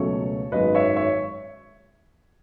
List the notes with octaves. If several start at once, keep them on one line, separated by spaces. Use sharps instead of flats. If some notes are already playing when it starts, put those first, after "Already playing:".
Already playing: C#2 B2 F#3 A3 C#4 A4 C#5
G#1 F#2 D#3 G#3 B4 D#5
C#5 E5
C#5 E5